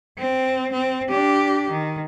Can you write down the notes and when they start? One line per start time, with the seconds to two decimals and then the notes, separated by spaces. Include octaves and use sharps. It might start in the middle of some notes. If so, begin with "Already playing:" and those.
0.19 C4
0.72 C4
1.10 D4 G4
1.70 D#3